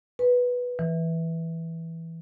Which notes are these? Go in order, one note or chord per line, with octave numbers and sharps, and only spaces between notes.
B4
E3